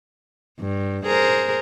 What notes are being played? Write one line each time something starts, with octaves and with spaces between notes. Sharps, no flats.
G2
G#4 A#4 C5